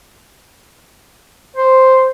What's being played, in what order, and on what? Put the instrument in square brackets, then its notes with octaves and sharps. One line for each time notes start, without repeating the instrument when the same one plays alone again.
[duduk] C5